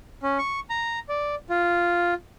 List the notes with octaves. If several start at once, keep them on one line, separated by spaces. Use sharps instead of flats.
C#4
C#6
A#5
D5
F4